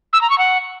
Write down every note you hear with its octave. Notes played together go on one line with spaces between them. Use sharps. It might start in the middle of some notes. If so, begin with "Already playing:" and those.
E6
A#5
C#6
F#5